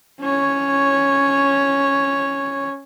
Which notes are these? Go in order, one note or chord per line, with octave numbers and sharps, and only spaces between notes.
C#4 C#5